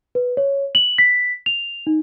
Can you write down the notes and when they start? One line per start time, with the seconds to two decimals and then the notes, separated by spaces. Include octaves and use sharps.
0.15 B4
0.37 C#5
0.75 F#7
0.98 B6
1.46 F7
1.87 D#4